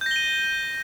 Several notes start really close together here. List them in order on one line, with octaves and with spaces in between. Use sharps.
G6 A#6 G7 D#7